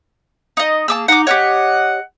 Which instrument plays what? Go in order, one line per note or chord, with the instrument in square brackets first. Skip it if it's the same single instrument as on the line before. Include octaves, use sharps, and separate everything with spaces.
[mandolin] D#4 D#5
[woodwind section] A#3 G#4 [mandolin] A5 D6 E6
[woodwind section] D#4 [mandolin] F#5 D6
[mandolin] G4 A#4 C#5 [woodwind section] D#5 F#5